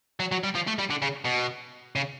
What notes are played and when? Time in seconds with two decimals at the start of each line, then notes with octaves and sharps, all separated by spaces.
0.20 F#3
0.32 F#3
0.44 G3
0.55 F3
0.67 A3
0.79 G3
0.90 D3
1.02 C#3
1.25 B2
1.96 C#3